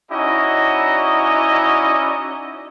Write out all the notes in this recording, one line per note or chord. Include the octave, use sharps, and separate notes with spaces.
C#4 D#4 E4 F#4 D5 D#5